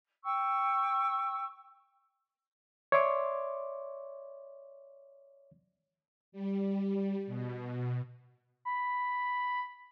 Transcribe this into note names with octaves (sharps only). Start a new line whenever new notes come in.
G5 C#6 E6
C#5 D5 E5 C6 D6
G3
B2
B5